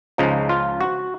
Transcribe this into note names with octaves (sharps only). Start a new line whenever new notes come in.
C#2 C#3 F3 D#4
F4
F#4